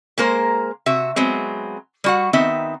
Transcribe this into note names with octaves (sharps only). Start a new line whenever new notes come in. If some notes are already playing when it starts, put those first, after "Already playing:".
G#3 A#3 A#4 C5
C3 F#4 E5
F#3 G#3 B3 C4
G3 F#4 F#5
D#3 B3 C4 D#4 E5